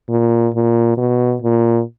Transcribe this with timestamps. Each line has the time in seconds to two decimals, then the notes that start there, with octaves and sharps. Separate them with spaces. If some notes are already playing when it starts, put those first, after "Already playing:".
0.09 A#2
0.54 A#2
0.98 B2
1.42 A#2